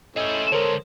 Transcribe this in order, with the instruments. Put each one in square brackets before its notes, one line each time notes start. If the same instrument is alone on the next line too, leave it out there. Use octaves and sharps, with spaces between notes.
[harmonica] A3 C#4 E4 [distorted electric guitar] G#4 C5 [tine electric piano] D#5
[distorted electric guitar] D3 G#3 [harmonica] A4 C5 [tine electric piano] A#4 C#5